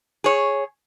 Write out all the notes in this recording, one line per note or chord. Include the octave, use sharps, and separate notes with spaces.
G#4 C#5